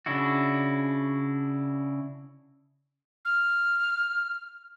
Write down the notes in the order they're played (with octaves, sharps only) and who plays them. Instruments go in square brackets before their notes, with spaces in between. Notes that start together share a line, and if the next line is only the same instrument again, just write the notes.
[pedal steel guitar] C#3 D4 E4 F#4
[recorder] F6